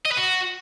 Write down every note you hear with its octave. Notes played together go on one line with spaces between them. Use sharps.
D#5
B4
F#4